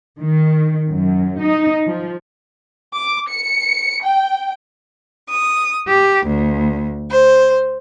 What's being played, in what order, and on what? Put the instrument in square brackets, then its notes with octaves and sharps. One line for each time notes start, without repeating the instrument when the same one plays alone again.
[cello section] D#3
F#2
D#4
F3
[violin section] D6
C#7
G5
[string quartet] D#6
G4
D2
C5